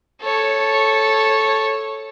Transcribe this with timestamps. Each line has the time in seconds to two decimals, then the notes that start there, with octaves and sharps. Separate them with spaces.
0.22 A4 C#5